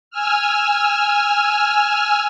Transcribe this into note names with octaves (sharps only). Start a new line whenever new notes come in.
G#5 E6 F6